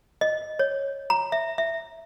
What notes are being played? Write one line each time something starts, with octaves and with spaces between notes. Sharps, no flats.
D#5
C#5
A#5
E5
E5